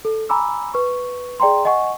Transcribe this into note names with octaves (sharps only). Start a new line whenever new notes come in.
A4
G#5 A#5 B5 D6 E6
B4 C#6
G#4 D5 G5 A#5 C6
D#5 F#5 G#5 C#6